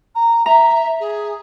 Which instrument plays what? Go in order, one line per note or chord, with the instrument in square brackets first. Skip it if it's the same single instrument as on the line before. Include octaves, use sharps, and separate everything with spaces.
[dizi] A#5
[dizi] E5 [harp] A#5
[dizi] G#4